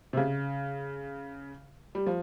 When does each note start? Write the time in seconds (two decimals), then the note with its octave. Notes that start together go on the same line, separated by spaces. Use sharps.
0.13 C3
0.17 C#3
1.95 G3
2.06 F3